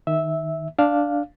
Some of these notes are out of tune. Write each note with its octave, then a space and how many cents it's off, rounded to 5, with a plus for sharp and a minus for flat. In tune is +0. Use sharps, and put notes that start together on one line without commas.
D#3 +0 E5 -10
D4 +0 F5 +0